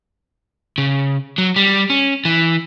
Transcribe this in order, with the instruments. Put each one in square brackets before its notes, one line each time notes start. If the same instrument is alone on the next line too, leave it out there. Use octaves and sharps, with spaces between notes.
[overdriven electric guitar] C#3
F#3
G3
C#4
E3